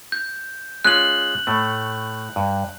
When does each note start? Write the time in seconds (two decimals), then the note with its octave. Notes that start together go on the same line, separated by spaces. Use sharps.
0.12 G6
0.85 G#3 C#4 F4 F#6 F#7
1.47 A2 A3
2.36 G2